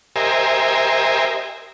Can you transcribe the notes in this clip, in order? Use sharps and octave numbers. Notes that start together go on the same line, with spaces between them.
G4 A#4 C5 D#5 E5 G#5